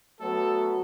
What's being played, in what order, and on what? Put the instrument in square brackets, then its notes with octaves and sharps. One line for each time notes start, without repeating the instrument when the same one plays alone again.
[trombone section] F#3 A3 B3 [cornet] A4